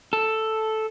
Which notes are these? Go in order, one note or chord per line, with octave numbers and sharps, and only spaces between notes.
A4